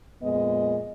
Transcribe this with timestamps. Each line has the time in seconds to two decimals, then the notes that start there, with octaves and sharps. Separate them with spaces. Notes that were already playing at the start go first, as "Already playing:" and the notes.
0.22 F2 A#2 G#3 B3 D#5